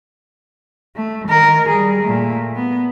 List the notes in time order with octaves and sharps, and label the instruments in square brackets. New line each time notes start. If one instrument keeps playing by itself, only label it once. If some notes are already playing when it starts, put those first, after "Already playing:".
[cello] A3
D#3 A#4
G3 G#4
A#2 A3
B3